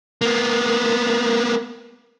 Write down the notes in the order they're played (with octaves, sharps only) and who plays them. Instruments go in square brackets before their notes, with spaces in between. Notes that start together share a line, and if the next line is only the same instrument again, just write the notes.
[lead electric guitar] A#3 B3